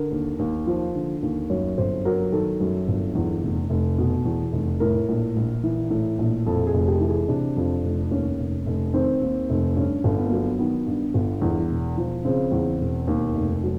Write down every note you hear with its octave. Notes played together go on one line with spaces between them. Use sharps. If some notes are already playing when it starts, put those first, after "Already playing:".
Already playing: D3 A#4
D#2
D#2
F3
D3
D#2
F#2 C#5
G1 C5
F#3 A#4
D#3 A4
F#2
G1
E2
F1
F1
B2
E2
F1
A2 A#4
A#1
A#1
E3
A2
A#1
F2 A4
G#4
F1
G4
E3
G#4
C3 D4
F2
F1
D#2 C#4
F1
F1
D#3 C4
D#2
F1
G2 C#4
G1
B3
A#3
F#3 B3
D#3 B3
G2
G1
E2
E1
F3
C#3 C4
E2
E1
D#2
F1
F#3